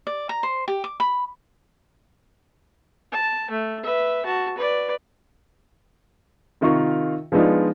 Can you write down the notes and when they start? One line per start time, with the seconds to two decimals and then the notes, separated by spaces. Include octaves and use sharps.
0.07 D5
0.29 A#5
0.43 C5
0.68 G4
0.84 D6
1.00 B5
3.12 A5
3.51 A3
3.84 B4 E5
4.26 F#4 A5
4.58 B4 D5
6.61 C3 D#3 F4 A#4 F5 C#6
7.32 F3 G#3 B3 D4 D#4 F4